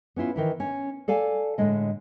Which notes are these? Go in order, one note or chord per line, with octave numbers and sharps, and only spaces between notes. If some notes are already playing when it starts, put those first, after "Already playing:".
B3 C#4 E4 F4
D#3 E3 E4
C#4
A4 D5 F5 G#5 A5
A2 D3 G#3 D#5